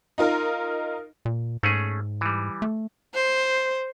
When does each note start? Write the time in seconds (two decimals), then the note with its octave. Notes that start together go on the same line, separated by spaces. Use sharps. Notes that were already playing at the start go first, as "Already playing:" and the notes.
0.18 D#4 F4 A#4
1.25 A#2
1.63 G#2 A3 C#4 G#4
2.21 E3 G3
2.62 A3
3.14 C5